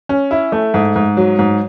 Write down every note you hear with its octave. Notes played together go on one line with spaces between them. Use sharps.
C#4
E4
A3
G#2
G#2
F#3
G#2